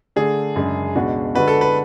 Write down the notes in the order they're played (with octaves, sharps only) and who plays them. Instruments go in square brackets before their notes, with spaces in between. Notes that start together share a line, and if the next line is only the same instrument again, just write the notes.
[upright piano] D3 A3 D4 [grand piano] G#4
[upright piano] F#2 C#3 G#3 D4
C#2 B2 G#3 D4 F#4
[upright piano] D3 G#3 D4 F#4 [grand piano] B4
[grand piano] A4
B4